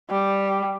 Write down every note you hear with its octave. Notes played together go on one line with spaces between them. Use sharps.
G3